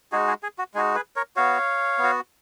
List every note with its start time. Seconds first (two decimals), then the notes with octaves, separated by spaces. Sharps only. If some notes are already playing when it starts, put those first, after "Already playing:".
0.12 G#3 D#4 F#4 G#4
0.28 G#4
0.43 G#4
0.59 F#4
0.74 G#3 D#4 F#4 G#4
0.95 G#4 B4
1.16 A#4 C#5
1.36 B3 F#4 C#5 F5
1.98 B3
2.03 F#4